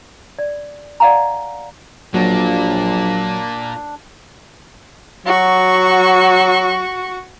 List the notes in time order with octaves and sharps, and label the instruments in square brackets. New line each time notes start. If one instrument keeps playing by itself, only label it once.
[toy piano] D5
D5 D#5 F5 F#5 G#5 A#5
[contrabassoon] A#1 [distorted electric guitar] A#2 A#3 [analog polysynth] F#3 [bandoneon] D4
[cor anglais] F#3 [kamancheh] F#4 C#6